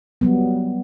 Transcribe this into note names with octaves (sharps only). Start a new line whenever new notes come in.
F#3 G3 B3